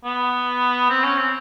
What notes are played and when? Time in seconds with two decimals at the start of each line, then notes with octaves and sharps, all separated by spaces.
0.05 B3
0.90 C4
1.03 C#4
1.18 C4